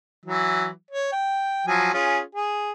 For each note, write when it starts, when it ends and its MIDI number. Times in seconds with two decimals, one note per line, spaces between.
0.26 0.68 52
0.26 0.68 54
0.91 1.11 73
1.12 1.62 79
1.67 1.91 53
1.67 1.91 54
1.67 1.91 80
1.93 2.20 61
1.93 2.20 65
1.93 2.20 68
2.35 2.71 68